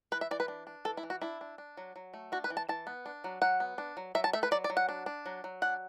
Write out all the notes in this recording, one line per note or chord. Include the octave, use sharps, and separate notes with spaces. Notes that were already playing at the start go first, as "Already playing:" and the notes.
E3 B4
E5
E3 D5
B4
D4
D4
E3 A4
E4
E3
F#4
D4 E4
D4
D4
F#3
F#3
A3
D4 F#4
B4
E3
A5
E3 A5
B3
D4
F#3
F#3 F#5
B3
D4
F#3
F#3 E5
A5
A3 E5
B4
F#3 D5
D5
F#3
F#5
D4
D4
F#3
F#3
D4 F#5